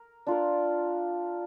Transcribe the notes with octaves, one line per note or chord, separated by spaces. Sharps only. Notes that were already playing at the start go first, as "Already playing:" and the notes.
Already playing: A#4
D4 F4 A#4